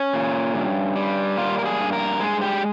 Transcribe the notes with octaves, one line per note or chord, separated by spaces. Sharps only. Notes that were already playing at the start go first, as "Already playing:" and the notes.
Already playing: C#4
A#2
G2
G3
A#3 F4
A#4
G#4
G2
A#4
G#3 G#4
G4